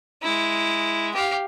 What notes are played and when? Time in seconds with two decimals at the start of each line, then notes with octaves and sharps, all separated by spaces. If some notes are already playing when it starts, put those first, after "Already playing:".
0.22 G#3 E4
1.14 G4 F5